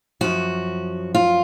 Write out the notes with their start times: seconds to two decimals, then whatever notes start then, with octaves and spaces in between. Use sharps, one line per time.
0.21 F#2 F3 F#4
1.15 F4